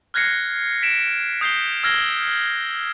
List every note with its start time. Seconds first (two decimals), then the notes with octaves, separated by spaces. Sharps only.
0.14 F6 F#6 G#6 A#6 C7 C#7
0.82 B6 D7 E7
1.41 D#6 G6 C7 G7
1.83 E6 F6 G#6 A#6 C7 G7